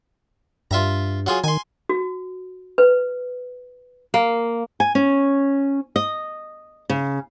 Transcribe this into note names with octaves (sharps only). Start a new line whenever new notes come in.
G2 F4 E5 A#5
F#3 F4 G#4
D#3 G#5 C6
F#4
B4
A#3
G#5
C#4
D#5
C#3